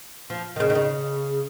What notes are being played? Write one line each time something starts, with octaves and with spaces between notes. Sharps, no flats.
F3
D#3
C#3
D#3
C#3